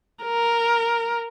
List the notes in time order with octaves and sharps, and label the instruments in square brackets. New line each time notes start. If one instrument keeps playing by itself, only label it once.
[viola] A#4